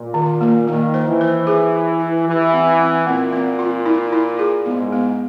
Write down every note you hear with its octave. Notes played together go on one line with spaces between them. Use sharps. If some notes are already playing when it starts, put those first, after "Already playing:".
Already playing: A#2
D#3
A#3
D#3 A#3
C5
E3
C5
G#4
G#4
E4
E3 G4
C4
C4
A#2 C4
C4
F4
E4
E4
G#4
G#2 B3
B3